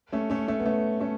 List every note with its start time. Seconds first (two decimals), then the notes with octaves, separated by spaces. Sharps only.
0.13 A3 C#4
0.30 A3 C#4
0.48 A3 C#4
0.60 B3
0.66 A3 C#4
1.00 A3 C#4